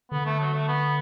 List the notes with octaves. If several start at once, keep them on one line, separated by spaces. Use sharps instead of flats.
D3 B3
A3
F#3
A3
B3